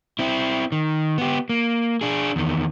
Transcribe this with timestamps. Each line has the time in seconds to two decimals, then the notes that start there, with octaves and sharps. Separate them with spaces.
0.19 C4 E4
0.72 D#3
1.18 B3 G4
1.49 A#3
2.01 D4 G#4
2.36 E2 D#3